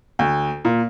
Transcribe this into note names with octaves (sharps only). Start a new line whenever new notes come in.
D2
A#2